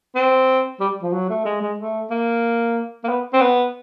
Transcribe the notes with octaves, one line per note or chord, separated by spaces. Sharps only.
C4
G3
F3
F#3
A3
G#3
G#3
A3
A#3
A#3
B3
C4
B3